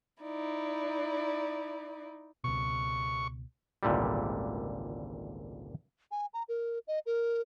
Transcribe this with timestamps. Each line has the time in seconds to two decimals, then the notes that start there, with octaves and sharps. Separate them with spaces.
0.23 D#4 E4 D5
2.44 C#2 B2 C#6
3.83 G#1 C#2 A#2 D3 E3 G3
6.11 G#5
6.34 A#5
6.49 A#4
6.88 D#5
7.06 A#4